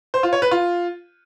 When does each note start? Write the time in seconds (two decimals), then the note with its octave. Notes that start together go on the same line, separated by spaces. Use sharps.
0.14 C5
0.23 F4
0.33 C#5
0.42 B4
0.51 F4